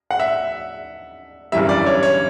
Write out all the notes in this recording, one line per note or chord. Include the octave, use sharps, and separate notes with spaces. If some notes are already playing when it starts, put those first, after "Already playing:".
F#5
E5
G1 F#2 E3 G3 E5
D5
C#5
C#5